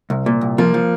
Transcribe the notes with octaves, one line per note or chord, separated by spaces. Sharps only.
C2
A#2
C2
F3 A#3
F3